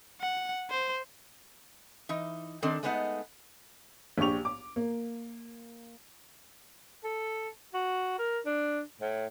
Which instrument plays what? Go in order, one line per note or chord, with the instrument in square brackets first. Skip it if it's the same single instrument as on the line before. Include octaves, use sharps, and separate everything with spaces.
[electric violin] F#5
C5
[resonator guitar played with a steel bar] E3 D#4
D#3 C4 D4 A4
G#3 A3 B3 D4 D#4 F#5
[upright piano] A#1 D4 G4 C#6 F7
D6
A#3
[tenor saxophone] A4
F#4
A#4
D4
A2